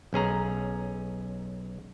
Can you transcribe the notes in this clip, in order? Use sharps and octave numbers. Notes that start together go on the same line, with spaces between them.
B1 C#4 G#4 A#5